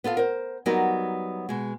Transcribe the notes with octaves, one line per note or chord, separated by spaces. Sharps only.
B3 F4 A4 F5
A#4 C5
F#3 G3 B3 D#4 F#4 A#4
B2 G#3